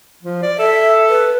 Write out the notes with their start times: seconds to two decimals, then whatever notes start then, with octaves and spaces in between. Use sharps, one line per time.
0.23 F3
0.43 D5
0.59 A4 E5
1.10 B4